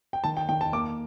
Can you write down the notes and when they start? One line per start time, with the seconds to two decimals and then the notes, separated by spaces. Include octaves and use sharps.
0.13 G5
0.24 D#3 A5
0.37 G5
0.49 D#3 G5
0.61 A5
0.73 A#3 D6